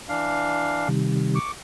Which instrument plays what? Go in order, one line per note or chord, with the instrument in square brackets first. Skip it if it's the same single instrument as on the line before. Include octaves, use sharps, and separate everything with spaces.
[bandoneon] E3 D4 F5
[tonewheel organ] C3 D#3 G3
[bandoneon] C#6 D6